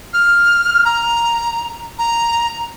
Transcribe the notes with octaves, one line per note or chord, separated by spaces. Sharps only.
F6
A#5
A#5